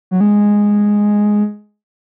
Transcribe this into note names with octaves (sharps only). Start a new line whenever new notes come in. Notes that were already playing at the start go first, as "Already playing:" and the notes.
F#3
G#3